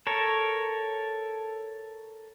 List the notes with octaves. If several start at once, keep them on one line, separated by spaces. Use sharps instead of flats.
A4 A#4 C#5